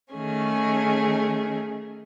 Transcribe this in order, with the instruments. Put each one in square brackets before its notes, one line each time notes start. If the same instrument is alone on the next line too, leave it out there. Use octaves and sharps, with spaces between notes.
[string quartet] D#3 A3 C#4 G#4